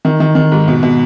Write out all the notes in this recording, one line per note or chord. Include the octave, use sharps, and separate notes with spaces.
D#3
D#3
D#3
G#2
B2
B2